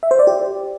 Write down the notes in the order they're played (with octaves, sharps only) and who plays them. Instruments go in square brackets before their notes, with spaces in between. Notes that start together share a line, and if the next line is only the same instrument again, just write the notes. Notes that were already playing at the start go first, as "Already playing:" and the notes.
[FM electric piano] E5
C5
D5
G4